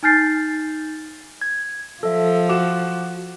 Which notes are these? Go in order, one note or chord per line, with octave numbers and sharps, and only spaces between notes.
D#4 G#5 F6 G6 A6 C7
G#6
F3 A4 E5
F#4 D6 E7